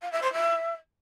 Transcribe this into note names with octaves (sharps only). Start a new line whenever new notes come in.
F5
E5
C5
E5